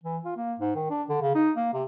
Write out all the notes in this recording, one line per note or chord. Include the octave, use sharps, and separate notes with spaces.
E3
F4
A#3
G#2
D#3
D4
D3
C#3
D#4
A#3
C3